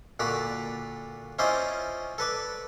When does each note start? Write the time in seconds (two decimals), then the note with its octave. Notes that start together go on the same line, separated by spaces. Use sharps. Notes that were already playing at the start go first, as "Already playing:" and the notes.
0.20 A#2 D3 F#4 D5 B5
1.39 C#4 E4 F4 C5 D5 D#5
2.18 A4 B4 D5